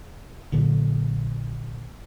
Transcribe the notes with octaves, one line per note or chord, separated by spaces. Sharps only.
A#1 A#2 D3 F#3